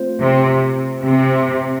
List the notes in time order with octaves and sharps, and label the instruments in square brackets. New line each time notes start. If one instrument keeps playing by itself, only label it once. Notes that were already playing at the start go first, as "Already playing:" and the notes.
Already playing: [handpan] A3 C4 F4 C5
[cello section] C3
C3